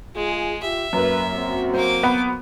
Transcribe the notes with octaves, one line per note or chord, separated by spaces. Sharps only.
G#3 F4 G#4
F4 G4 E5
F#2 A#3 B4
C4 F#4
F#3 A#3 C5 D6
B3